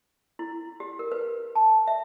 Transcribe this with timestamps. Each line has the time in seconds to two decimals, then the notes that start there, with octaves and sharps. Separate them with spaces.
0.39 E4
0.80 G4
0.99 A#4
1.12 B4
1.55 A5
1.87 E5